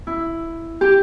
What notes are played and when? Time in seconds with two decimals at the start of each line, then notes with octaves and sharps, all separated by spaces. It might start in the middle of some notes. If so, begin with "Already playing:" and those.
0.07 E4
0.81 G4